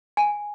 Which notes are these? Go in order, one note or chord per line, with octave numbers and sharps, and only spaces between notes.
G#5